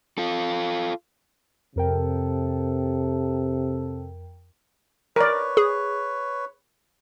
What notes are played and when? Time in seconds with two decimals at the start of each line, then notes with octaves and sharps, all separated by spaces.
0.18 F4 A4
1.76 F2 C3 A4 A#4 G5
5.16 A#4 B4 C#5 D5
5.57 G#4